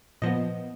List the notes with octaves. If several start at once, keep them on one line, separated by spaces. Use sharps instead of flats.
A#2 F3 B3 D#5